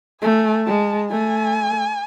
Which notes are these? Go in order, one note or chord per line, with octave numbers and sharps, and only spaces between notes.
A3 G#5
G#3 A5
A3 G#5